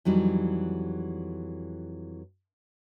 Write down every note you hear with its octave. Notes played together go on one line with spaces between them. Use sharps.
F2 E3 F#3 G3 D#4